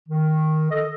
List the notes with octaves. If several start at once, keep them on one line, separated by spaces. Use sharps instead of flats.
D#3
A4 D#5